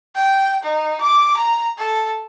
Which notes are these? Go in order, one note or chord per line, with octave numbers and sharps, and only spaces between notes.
G5
D#4
D6
A#5
A4